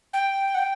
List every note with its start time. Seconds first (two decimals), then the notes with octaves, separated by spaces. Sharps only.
0.13 G5
0.55 F#5
0.58 G5